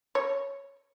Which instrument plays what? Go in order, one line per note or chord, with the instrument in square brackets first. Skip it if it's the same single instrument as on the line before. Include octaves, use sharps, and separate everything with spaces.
[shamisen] C#5